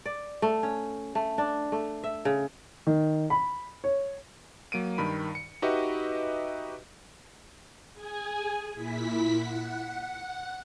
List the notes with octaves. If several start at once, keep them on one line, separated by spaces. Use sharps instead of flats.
D5
A3
C#4
A3
D4
A3
E5
C#3
D#3
B5
C#5
F#3 A#3 D7 D#7
G2 D#3 B5
C#7
D#4 F#4 G4 B4 D#5 E5
G#4 G#5
A#2 E4 B6
F#5